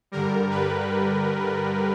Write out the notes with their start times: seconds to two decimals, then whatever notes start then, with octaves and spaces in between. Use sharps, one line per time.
0.12 G2 D3 G3 A#4
0.51 B4